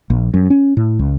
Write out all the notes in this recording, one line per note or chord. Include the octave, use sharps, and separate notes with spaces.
A#1
F#2
C#4
A2
C#2